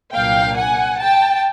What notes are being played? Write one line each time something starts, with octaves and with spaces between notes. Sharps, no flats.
C2 A#2 F#3 A#3 D4 F5 G5
F#5 G#5
G5 A5